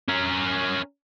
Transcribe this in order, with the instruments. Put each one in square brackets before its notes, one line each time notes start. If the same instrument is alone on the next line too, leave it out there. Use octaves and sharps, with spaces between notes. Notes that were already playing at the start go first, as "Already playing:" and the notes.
[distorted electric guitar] C#4 A#4